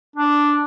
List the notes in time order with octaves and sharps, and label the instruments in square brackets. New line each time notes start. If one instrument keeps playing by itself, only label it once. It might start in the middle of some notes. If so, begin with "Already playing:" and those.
[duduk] D4